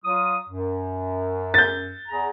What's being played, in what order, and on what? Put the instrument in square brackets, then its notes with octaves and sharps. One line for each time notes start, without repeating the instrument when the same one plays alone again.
[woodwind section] F#3 F4 D#6
F#2
[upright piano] G6 A6
[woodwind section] E2 G#4 A#5